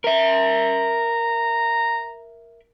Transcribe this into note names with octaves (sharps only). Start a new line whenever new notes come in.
A#4 E5 A#5